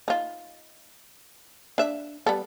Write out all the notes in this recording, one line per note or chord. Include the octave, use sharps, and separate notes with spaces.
D#4 F4
D4 E5
G3 B3 A4